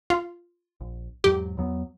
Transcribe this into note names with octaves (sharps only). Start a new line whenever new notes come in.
F4
A#1
E2 G#2 F#3 G4
E2 F#3 B3